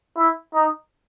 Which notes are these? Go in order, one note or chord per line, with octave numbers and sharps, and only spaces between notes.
E4
D#4